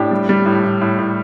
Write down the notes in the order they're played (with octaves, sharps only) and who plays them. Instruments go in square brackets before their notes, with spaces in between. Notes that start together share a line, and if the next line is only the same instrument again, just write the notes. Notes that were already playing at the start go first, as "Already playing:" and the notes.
Already playing: [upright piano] A2 D4 G4
G3
G3
A2
A2
A2
A2